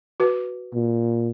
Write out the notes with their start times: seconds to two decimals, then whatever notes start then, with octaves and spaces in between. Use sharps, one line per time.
0.20 F#4 B4
0.74 A#2